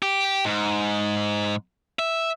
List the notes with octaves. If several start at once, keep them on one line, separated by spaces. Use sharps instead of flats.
G4
G#2
E5